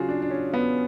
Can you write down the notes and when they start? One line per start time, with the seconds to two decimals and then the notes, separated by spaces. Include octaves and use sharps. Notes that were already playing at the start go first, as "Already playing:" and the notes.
Already playing: C#3 F#3 F4 F#4 G#4
0.09 D4
0.22 D4
0.30 C#4
0.54 B3